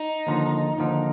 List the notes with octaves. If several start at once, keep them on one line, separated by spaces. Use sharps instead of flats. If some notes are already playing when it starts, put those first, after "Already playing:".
Already playing: D#4
D#2 D3 F3
D#2 D3 F3